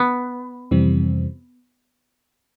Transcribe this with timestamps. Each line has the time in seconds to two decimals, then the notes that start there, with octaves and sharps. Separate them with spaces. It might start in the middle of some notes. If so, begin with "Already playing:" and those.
Already playing: B3
0.71 F2 C3 E3 G3 C4